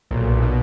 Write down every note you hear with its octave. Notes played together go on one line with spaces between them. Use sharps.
B1 A#2
B2